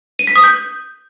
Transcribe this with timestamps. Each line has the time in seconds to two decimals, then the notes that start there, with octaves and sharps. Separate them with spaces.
0.19 D#7
0.27 B6
0.36 D#6
0.44 G6